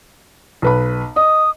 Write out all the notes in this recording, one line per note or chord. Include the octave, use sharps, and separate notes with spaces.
B1 B4 B5
D#5 D#6